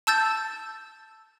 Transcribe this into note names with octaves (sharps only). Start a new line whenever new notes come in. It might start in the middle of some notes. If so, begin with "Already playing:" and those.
A5 E6 G6 A6